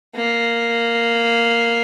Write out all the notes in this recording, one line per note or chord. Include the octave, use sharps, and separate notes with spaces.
A#3